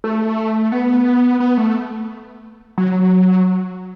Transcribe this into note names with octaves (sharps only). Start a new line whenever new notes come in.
A3
B3
B3
A3
F#3